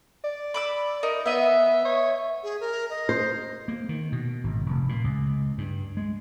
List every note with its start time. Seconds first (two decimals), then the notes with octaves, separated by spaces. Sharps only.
0.24 D5
0.54 B5 D6 E6
1.03 D#4 A#4
1.26 B3 D#5 E5
1.85 C#5
2.43 G#4
2.60 A#4
2.90 D#5
3.09 C5
3.68 A#3
3.89 D#3
4.12 B2
4.44 G#1
4.66 F1
4.89 A#2
5.04 C#2
5.58 G2
5.97 G#3